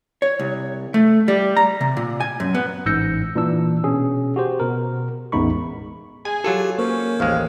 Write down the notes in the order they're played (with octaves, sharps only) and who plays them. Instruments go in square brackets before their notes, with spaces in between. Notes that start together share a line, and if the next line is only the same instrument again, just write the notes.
[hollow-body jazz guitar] C#5
C2
A3
G3
A#5
C3
A#2
G#5
F#2
B3
[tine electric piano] A1 G#2 E6 G6 A#6 C#7
A#2 E3 D4 E6
B2 C#4 G#4
F#4 G4 C5
B2 A#4
A1 E2 G#3 D#4 B5 C#6
[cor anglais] G#4 [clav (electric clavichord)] G#5
[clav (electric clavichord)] F#3 F4 A4 [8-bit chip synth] G4
[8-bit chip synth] A#3 A#4 C5 [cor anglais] C#4
[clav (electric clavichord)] A1 D#2 G#3 [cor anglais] F5